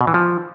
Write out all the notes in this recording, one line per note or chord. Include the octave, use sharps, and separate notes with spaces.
B2
E3
F3